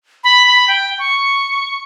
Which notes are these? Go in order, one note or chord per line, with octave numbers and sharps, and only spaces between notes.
B5
B5
G5
C#6